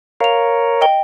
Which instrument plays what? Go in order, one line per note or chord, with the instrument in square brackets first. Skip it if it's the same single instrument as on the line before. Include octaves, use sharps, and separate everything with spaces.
[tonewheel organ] A#4 C#5 [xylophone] F5 F7
[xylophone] D#5 G5 G7